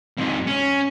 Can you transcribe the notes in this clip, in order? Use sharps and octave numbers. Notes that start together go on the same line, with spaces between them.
F2 G#2
C#4